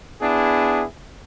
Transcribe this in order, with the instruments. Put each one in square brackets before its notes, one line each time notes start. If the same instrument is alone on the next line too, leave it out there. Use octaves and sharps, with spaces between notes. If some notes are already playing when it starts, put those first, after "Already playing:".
[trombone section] B3 D4 E4 G#4